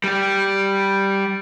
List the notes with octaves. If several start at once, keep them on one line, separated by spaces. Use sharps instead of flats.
G3 G4